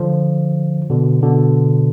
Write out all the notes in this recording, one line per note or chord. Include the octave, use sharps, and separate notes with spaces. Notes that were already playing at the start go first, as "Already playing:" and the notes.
Already playing: D3 F3
B2 D3
B2 D3